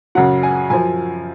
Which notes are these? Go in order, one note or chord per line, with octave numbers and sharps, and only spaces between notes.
F#2 C#3 F#3 F#5
G#5
F#2 F3 G#5